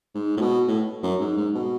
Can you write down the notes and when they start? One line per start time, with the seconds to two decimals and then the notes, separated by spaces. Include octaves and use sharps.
0.15 G#2
0.37 A2
0.41 B2
0.68 A2
1.03 F#2
1.20 G#2
1.37 G#2
1.55 B2